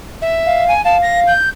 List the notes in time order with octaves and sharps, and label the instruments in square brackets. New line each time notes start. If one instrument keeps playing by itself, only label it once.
[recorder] E5
[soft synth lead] F5
[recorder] G#5
[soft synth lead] F5 [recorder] A5
[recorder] A#6
G6